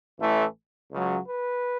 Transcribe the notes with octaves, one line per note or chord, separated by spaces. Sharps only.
A1 A2 E3 A3
C#2 C#3 F#3
B4